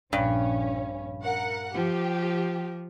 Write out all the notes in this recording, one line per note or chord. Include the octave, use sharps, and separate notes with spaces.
A#1 G2 C#4
A#4 F#5
F3 G4